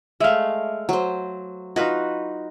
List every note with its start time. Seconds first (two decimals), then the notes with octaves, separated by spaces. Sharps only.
0.20 G#3 A3 E5 F5
0.89 F#3 C5
1.76 D#4 F4 F#4 B4 D#5